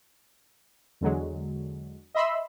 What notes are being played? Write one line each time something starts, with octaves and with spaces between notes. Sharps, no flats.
E2 D3 F#3 G#3
D#5 E5 B5 C6 E6